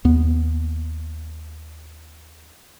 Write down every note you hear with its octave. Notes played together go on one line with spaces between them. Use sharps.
D#2 B3